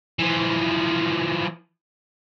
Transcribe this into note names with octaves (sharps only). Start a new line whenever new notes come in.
E3 F3